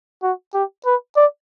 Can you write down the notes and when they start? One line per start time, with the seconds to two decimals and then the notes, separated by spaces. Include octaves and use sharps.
0.23 F#4
0.54 G4
0.86 B4
1.16 D5